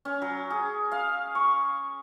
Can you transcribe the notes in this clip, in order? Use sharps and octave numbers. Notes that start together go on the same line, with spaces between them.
C#4
F#3
G#4
F5
C#6